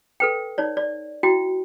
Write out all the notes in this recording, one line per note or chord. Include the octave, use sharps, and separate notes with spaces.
A4 B4 G5
D#4 C#5 D5
D5
E4 F#4 G5